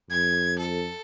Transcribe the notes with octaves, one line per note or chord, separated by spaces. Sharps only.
F2 G#6
A4